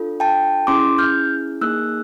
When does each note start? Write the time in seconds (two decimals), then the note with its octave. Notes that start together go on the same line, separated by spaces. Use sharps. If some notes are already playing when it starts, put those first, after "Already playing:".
Already playing: D4 F4 A4
0.20 G5 A5
0.67 C#4 E4 G#4 C6 D6
0.98 F6 G6
1.61 A#3 D#4 G#4 E6 F#6